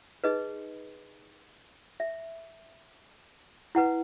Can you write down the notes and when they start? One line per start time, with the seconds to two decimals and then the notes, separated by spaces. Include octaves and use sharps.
0.24 D#4 G#4 B4 D#5
2.00 E5
3.75 E4 B4 F#5